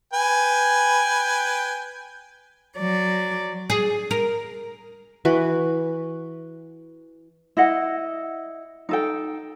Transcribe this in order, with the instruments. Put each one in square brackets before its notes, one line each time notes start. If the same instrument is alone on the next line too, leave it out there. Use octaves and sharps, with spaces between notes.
[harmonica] B4 G5 G#5
[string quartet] F#3 D5
[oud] G#4
A#4
[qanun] E3 F#4 B4
[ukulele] E4 D#5 F#5
D#4 A4 G5